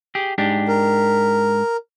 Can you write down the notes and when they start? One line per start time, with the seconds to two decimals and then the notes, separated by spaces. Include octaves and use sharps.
0.15 G4 G#4
0.38 G#2 D4 G4
0.68 A#4